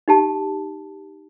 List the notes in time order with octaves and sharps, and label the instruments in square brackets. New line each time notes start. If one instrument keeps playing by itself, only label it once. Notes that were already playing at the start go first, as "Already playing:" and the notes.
[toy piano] D#4 G4 A5